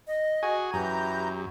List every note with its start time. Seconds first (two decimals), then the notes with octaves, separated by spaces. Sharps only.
0.07 D#5
0.43 F#4 G#4 G#5
0.73 F#2 E3 G4 A#5 G6